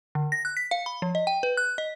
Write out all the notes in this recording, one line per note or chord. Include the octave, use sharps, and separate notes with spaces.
D3
A#6
F#6
B6
F5
B5
F3
D#5
G5
B4
F#6
D#5